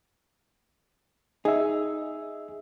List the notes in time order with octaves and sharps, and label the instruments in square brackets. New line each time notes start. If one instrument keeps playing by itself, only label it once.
[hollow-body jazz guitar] D#4 [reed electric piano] G#4 E5